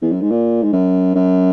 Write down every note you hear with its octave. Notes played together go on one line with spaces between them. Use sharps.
E2
F#2
G#2
A#2
G#2
F#2
F#2